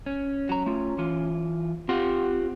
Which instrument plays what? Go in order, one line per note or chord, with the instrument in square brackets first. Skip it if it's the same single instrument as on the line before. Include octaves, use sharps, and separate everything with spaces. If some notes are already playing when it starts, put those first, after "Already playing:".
[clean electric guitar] C#4
[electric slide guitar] F#3 A#5
A3 F4
E3 F4
[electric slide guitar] C4 [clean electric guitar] F4 G4 F#5